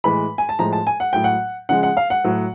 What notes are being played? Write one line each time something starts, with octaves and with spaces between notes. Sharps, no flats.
A2 E3 G#3 B5
G#5
A5
A2 F3 G#3 A#5
A5
G#5
F#5
A2 F#3 G5
F#5
C#3 F3 G#3 F#5
F#5
F5
F#5
A2 F#3